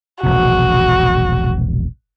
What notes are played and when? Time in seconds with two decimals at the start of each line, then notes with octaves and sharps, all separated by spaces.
0.23 E1 A#1 C3 F#4